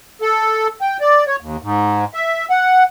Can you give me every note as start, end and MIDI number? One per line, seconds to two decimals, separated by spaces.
0.22 0.67 69
0.81 0.97 79
1.01 1.24 74
1.27 1.36 73
1.40 1.57 39
1.62 2.05 44
2.14 2.46 76
2.50 2.84 78